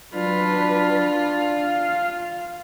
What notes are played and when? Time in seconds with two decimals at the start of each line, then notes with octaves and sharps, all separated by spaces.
0.15 F#3 D4 F4 B4
1.12 F5